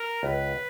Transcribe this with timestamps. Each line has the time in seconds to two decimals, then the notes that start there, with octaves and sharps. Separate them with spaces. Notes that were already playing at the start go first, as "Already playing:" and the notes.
Already playing: A#4
0.23 C#2 B4